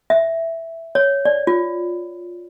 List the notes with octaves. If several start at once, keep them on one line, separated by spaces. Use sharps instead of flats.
E5
C#5
D5
F4